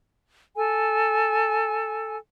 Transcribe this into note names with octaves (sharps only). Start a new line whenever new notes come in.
A4 G#5